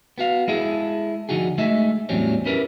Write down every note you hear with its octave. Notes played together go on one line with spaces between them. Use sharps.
B3 F#4 F5
G#3 E4 G#4 A4
D3 F3 D#4 F#4 G#4
G#3 A3 D#4 G#4 E5
E2 A2 F#3 G3 C4 C#4
C#4 E4 G4 A#4 B4